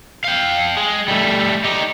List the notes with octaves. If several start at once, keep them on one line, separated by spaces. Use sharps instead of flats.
F5 G5
G#3
G3 A3
D#4 G4